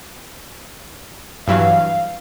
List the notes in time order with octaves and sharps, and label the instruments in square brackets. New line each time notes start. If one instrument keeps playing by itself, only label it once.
[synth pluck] G2 E3 F#3 [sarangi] F5